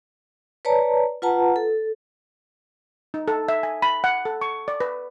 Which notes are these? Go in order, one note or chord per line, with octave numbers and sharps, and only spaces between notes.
B4 C#5 D5 A5 A#5
F4 B4 F#5 A5 A#5
A4
D#4
A4
E5
G#5
B5
F#5
A4
C#6
D5
B4